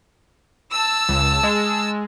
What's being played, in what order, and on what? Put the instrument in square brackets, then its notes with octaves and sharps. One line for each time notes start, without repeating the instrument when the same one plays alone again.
[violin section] A5 E6
[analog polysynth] C#2
G#3